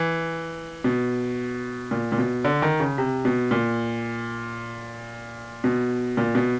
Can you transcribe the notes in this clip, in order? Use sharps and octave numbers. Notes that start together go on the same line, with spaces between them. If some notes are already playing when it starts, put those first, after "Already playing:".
Already playing: E3
B2
A#2
A#2
B2
D3
D#3
C#3
C3
B2
A#2
B2
A#2
B2